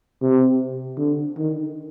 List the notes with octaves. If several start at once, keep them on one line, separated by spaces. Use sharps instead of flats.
C3
D3
D#3